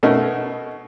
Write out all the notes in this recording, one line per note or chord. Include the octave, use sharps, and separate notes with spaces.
B2 A3 C#4 D#4 A#4